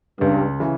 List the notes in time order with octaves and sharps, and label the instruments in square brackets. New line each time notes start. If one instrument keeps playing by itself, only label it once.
[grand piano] C#2 [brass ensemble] G2
[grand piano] C#3 E3